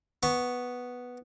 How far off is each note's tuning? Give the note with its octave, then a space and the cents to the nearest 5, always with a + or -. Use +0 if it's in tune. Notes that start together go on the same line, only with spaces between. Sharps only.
B3 +0 C#6 +0